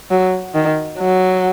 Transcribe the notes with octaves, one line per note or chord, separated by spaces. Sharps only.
F#3
D#3
F#3